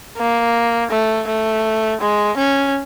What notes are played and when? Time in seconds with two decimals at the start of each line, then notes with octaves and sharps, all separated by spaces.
0.18 A#3
0.91 A3
1.27 A3
2.01 G#3
2.37 C#4